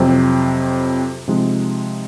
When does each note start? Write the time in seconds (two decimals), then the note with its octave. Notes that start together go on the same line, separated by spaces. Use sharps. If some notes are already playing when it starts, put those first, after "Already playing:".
Already playing: F2 C3 F#3 C4
1.28 C3 F3 G#3 D#4